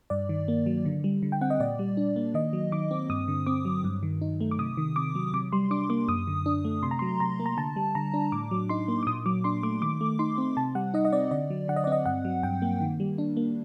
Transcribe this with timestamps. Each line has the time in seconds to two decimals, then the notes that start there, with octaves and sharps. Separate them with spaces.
0.10 G2 D5
0.29 D#3
0.48 A#3
0.66 F#3
0.85 D3
1.04 G3
1.23 D3
1.32 G5
1.41 C4 F#5
1.50 D#5
1.60 A#2 D5
1.79 G3
1.97 D4
2.16 A#3
2.34 D#3 D#5
2.53 F#3
2.72 D#3 D6
2.91 C4
3.09 G2 D#6
3.28 D3
3.46 C4 D6
3.65 F#3
3.84 G2
4.03 D#3
4.21 D#4
4.41 A3
4.51 D6
4.59 C3 D#6
4.77 D#3
4.96 C3 D6
5.15 F#3
5.33 C3 D6
5.52 G3 C6
5.71 D4 D6
5.90 A#3 D6
6.08 F#2 D#6
6.27 D3
6.46 D4
6.65 A3
6.83 C3 C6
6.91 A#5
6.99 C6
7.02 F#3
7.20 C3 A#5
7.40 A#3
7.46 A#5
7.57 D3 A5
7.76 G3
7.95 D3 A#5
8.14 D4
8.32 A2 D6
8.51 F#3
8.69 D#4 C6
8.88 A#3
9.03 D6
9.07 A#2 D#6
9.26 F#3 D6
9.44 D4 C6
9.63 A3 D6
9.82 D#3 D6
10.01 A3
10.19 D#4 C6
10.38 C4
10.57 C3 A5
10.75 G3 F#5
10.94 D#4 D#5
11.05 D#5
11.12 C4 D5
11.31 D3 D5
11.50 F#3
11.68 D3 F#5
11.76 D#5
11.84 D5
11.87 C4 D#5
12.06 G2 F#5
12.25 F#3
12.43 G2 G5
12.62 A#3
12.81 D#3
13.00 G3
13.18 D4
13.37 A#3